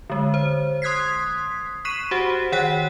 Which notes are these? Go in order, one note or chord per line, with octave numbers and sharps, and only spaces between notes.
D3 G#3
C5
C6 D#6 F#6 G#6 B6 C7
C#6 F#6 B6 C7 D#7 E7
F#4 G4 C5 F#5
D#3 C#5 F#5 G5 F#6 B6